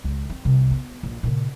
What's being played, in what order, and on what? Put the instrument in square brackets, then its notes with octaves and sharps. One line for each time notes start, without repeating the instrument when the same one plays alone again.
[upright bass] C#2
C4
C2 C3
B3
A#1
A#2 C#3